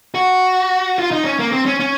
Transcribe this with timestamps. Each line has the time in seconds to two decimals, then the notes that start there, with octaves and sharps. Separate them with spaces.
0.15 F#4
0.98 F4
1.11 D#4
1.24 C#4
1.39 A#3
1.52 C4
1.66 C#4
1.80 C#4